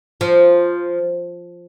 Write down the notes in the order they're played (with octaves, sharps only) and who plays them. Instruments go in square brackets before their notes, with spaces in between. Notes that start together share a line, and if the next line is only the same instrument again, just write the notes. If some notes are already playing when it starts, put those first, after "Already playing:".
[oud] F3